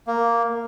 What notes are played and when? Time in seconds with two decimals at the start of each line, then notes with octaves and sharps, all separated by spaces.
0.07 A#3